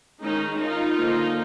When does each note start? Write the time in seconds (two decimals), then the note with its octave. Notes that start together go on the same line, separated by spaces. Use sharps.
0.23 D#3 G#3 C#4 D#4
0.60 D#4 F4
0.97 D3 F3 A#3